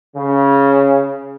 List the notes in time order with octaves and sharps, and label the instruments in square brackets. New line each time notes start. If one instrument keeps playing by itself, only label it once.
[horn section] C#3